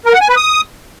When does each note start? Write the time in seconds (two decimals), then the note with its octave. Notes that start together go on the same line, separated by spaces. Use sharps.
0.06 A#4
0.13 F#5
0.21 G#5
0.29 B4
0.37 D#6